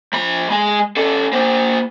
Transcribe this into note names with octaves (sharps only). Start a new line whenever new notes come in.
F3 B5
G#3 G#5
C#4 A4
A#3 C5